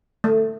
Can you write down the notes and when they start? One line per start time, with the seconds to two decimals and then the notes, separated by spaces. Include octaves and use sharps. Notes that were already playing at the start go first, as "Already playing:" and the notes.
0.24 A3